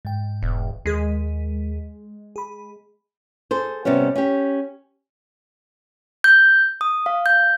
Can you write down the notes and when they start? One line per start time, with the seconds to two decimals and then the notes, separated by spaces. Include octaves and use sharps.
0.05 G#2 G5
0.43 E1
0.86 D#2 G#3 G#4 B6
2.36 G#4 B5
3.51 G#4 A4 C5
3.85 C3 G3 B3 C#4
4.16 C#4 G4
6.24 G6
6.81 D#6
7.06 F5
7.26 G6